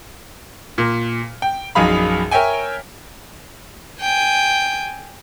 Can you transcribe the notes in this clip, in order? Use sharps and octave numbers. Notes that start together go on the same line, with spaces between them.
A#2
G5
A#1 F#2 D#4 G#4 F5 B5
A#4 C#5 E5 G5 G#5
G5 G#5